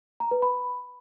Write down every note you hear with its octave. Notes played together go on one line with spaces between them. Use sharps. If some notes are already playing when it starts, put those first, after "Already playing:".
A#5
B4
B5